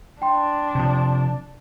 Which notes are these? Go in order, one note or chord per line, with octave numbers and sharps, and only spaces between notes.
D4 G5 C6
C3 F3